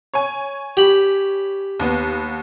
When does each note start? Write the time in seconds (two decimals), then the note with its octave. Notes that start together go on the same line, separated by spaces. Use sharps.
0.14 C#5 G#5
0.77 G4 B5
1.79 D#2 B3